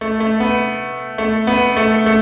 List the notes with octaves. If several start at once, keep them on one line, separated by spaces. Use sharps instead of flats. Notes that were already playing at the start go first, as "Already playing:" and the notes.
A3
A3
B3
A3
B3
A3
A3